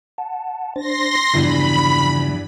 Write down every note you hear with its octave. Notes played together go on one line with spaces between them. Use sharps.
F#5 A5
D4 C5 C6 A6 A#6
E2 G2 C#3 E3 F3 B5